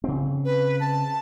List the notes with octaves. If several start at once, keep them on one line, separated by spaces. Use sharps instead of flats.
C#3 C4
B4
A5